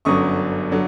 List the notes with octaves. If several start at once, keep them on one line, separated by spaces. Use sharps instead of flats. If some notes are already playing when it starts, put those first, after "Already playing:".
G1 F#2 D3 F#3 C#6 D#6
D3 F#3